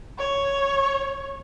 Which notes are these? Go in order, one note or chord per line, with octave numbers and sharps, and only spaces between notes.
C#5